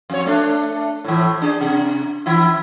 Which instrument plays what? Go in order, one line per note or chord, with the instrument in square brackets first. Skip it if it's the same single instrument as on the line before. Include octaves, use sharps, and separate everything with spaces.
[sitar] F2 C#5
A3 D4
A2 E3
D4 G#4
C3
E3 E4